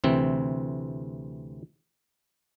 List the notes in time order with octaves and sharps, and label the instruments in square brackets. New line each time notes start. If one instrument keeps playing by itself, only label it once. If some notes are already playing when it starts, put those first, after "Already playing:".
[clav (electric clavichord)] D2 C3 E3 C4